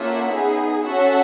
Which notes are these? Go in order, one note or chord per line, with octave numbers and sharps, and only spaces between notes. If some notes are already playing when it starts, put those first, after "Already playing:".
Already playing: A#3 C#4 F4 A4 E5 F#5
B3 D#4 G#4
C#4 F#4 A4 E5 F#5